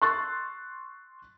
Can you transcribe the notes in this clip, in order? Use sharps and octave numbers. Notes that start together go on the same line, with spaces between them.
C6 C#6 E6 F#6 A6